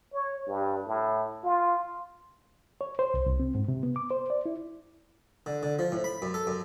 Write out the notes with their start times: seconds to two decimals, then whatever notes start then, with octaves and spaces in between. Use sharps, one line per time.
0.13 C#5
0.47 G2
0.86 A2
1.44 F4
2.81 C#5
2.99 C5
3.14 C2
3.26 C2
3.40 C4
3.55 G#2
3.68 C3
3.83 B3
3.96 D6
4.11 C5
4.30 D5
4.46 E4
5.46 D3
5.63 D3
5.79 F3
5.92 A2
6.04 B5
6.22 F#2
6.34 A4
6.47 F#2